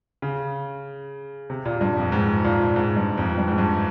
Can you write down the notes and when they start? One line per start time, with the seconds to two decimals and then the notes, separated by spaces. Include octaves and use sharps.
0.22 C#3
1.50 C3
1.65 A#2
1.81 G2
1.97 F2
2.12 G#2
2.44 A#2
2.76 G#2
2.97 G2
3.18 F2
3.38 G2
3.48 G#2
3.58 G2